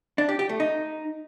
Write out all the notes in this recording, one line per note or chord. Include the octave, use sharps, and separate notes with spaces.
D4
G4
G4
A3
D#4